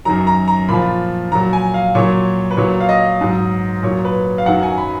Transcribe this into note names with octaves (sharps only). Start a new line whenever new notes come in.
F#2 D#3 F#3 A#5
A#5
A#5
A#2 F3 B5
A#2 F#3 A#5
G#5
F5
A#2 F#3 C#5
B4
A#2 F#3 C#5
F5
D#5
G#2 F#3
A#2 F#3 C#5
B4
F5
F#2 D#3 F#3 F#5
G#5
B5